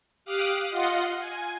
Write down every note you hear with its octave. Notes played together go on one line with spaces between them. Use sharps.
G4 F5 D6 D#6 F6 F#6
F4 D#5 F5 F#5 C6
G#5